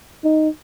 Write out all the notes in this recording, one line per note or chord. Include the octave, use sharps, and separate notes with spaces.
D#4